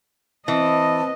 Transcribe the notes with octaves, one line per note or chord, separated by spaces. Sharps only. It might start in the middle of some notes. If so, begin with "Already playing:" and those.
E3 C4 D#5 A5